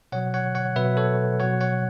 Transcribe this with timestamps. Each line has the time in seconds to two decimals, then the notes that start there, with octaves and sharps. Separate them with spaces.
0.12 B2 F#3 C#5 F#5
0.34 C#5 F#5
0.55 C#5 F#5
0.76 B2 F#3 B4 E5
0.97 A4 C#5
1.40 B2 F#3 C#5 F#5
1.61 C#5 F#5